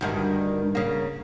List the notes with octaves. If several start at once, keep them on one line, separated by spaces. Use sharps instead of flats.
D2 G2 D#3
C#3 A#3